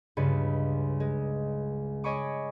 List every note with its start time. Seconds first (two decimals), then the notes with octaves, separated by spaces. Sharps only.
0.17 C#2 G2 C#3 B4 C#7
1.00 G#3
2.04 C#5 D#5 G#5 B5 C#6 D6